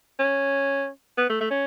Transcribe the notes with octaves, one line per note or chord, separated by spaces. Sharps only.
C#4
B3
A3
A3
C#4